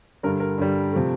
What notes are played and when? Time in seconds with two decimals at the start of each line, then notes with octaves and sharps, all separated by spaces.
0.23 G2 D3 G3 A#4
0.40 A#4
0.58 G2 D3 G3
0.93 C3 F3 A3